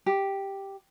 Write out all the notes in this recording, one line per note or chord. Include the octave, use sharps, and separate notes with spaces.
G4